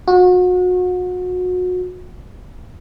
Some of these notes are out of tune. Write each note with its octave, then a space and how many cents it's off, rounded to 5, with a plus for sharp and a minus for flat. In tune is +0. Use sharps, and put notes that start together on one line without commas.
F#4 -30